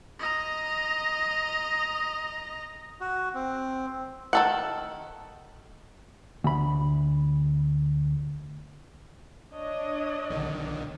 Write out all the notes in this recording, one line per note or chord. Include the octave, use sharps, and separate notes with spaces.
D#5 A#5
F#4
C4
D#3 A4 F#5
D2 B5
D4 C#5 D#5
B1 D3 D#3